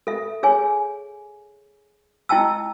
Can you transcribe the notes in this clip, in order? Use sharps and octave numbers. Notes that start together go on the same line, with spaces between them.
A4 E5
G#4 C#5 G#5
E4 D#5 G5 A5 E6